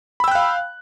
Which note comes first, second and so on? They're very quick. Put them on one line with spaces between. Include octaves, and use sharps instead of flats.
B5 E6 G5 F#6 F5